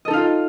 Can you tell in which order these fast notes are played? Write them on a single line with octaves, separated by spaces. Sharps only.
D#5 A4 D#4 F5 F4